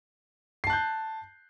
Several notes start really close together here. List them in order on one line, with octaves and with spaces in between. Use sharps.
C7 A5 F#6 G6